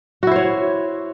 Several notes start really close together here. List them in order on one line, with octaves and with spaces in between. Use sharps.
F#4 E4 C5 C#5